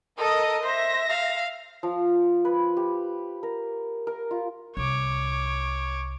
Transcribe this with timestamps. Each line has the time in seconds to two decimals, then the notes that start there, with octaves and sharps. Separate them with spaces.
0.18 A4 A#4 D#5
0.63 C5 E5 A#6
1.10 F5
1.83 F3
2.45 B4
2.77 G4
3.43 A#4
4.07 A#4
4.31 F4
4.77 C2 C#5 D6